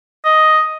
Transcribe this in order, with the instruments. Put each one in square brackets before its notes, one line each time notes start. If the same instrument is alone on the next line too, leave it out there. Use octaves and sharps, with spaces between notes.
[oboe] D#5